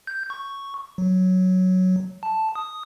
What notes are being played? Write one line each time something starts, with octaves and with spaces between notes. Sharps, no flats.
G6
C#6
F#3
A5
D#6